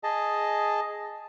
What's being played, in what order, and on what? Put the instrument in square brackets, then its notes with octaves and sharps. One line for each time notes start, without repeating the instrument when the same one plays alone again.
[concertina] G#4 D#5 A5